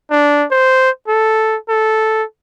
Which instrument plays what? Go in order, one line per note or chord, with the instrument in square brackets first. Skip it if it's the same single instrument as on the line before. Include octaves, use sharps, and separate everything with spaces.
[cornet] D4
C5
A4
A4